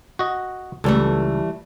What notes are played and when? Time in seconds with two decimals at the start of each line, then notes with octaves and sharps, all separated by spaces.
0.19 F#4 D#5
0.84 C#2 E3 G3 A3 A4